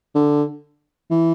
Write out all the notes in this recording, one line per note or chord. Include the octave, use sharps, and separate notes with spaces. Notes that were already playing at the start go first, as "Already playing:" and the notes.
D3
E3